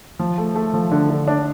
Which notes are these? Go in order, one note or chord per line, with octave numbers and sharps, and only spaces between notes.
F3
A3
A3
F3
D3
D3
D4